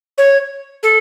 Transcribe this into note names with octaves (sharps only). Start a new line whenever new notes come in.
C#5
A4